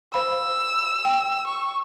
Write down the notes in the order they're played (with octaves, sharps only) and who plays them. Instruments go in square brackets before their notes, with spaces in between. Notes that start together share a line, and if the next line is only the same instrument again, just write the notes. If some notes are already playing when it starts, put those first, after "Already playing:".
[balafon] C5 F5 B5 [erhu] E6
[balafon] G5
[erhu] C#6